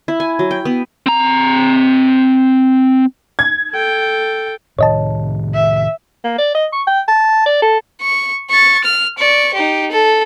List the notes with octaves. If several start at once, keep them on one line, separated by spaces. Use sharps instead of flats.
E4
G#5
F#3
G5
B3
C4 A#5
G#6
A4 G5
A2 C3 D#3 C#5 D#5 A5
E5
A#3
D5
D#5
C#6
G5
A5
D5
A4
C#6
C#6 A6
F6
D5 C#6
D#4 G4
A4